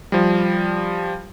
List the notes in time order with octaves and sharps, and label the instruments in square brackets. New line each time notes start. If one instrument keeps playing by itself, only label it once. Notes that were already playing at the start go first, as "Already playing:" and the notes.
[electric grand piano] F3 G3